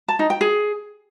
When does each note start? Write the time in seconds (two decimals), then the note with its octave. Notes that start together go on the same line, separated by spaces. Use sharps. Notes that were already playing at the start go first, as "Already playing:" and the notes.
0.08 A5
0.19 D#4
0.30 G5
0.41 G#4